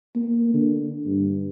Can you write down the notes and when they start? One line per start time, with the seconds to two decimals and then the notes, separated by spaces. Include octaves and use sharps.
0.15 A#3
0.54 D3
1.06 G2